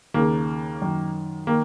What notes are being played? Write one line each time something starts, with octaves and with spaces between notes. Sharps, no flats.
D#2 C#3 A#3
F#2 D#3
D#3 A#3